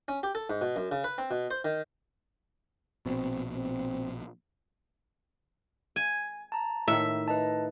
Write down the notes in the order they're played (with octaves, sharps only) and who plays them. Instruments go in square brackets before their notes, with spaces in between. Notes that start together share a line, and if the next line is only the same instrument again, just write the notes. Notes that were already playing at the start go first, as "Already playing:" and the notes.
[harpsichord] C#4
G4
A4
G#2
B2
F#2
C#3
B4
C4
B2
C5
D#3
[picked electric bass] A#1 B2 [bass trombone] C4
[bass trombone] C4
[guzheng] G#5
[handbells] A5 A#5
[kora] A2 D#3 [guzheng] E5
[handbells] B4 D#5 A5